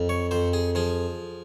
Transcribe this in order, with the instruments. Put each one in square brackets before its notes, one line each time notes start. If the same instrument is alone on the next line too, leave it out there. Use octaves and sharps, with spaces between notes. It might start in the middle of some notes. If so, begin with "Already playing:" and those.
Already playing: [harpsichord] F2
C#5
F2 C5
G#4
F3 G#4